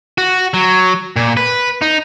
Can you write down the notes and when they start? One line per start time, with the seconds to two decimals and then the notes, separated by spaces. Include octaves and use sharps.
0.18 F#4
0.54 F#3
1.16 A#2
1.37 B4
1.82 D#4